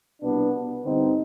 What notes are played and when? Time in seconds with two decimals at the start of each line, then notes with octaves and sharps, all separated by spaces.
0.22 C2 B2 B3 D4
0.84 G2 D3 C4 D#4